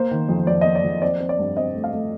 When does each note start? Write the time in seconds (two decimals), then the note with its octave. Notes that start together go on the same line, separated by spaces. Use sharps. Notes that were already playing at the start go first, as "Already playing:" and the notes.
Already playing: A#3 C5
0.11 D#3
0.29 F2
0.47 F2 D5
0.61 A#3 D#5
0.75 D5
0.83 F2
1.02 C4 D5
1.20 C4
1.29 D5
1.39 G2
1.57 C4 D#5
1.75 A3
1.84 F5
1.93 A3